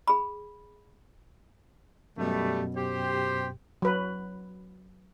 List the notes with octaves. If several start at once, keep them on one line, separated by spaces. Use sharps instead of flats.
G#4 B5
F#2 B2 G3 A3
G4 C5
F#3 B4